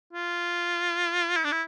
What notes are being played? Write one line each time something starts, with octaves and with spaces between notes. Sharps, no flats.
F4
E4
D4
E4